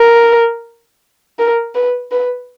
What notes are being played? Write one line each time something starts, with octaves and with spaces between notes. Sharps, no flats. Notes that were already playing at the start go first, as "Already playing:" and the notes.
Already playing: A#4
A#4
B4
B4